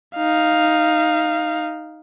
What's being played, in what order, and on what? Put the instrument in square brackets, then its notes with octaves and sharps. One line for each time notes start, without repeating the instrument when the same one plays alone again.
[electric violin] D#4 F5